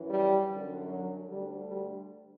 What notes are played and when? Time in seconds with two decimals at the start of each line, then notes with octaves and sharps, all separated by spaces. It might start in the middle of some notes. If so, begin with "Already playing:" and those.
Already playing: F#2 E3
0.10 G3
0.50 F#2 D3
0.90 F#3
1.29 D2 D3 G3
1.69 G3